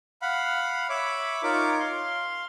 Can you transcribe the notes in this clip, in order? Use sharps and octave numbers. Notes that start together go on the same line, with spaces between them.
F5 F#5 B5
C#5 E5 B5 D6
D#4 F4 A#4 C#5 D6
F5 C6